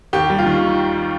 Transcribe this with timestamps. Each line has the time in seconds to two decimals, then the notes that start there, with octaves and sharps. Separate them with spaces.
0.13 D#2 G4
0.30 G3
0.38 F4
0.46 D#3